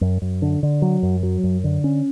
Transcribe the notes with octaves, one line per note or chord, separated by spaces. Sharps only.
F#2
F#2
D3
D3
F#3
F#2
F#3
F#2
D3
C#4